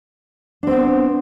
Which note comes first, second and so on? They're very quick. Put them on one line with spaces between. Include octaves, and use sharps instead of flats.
D4 C4 B3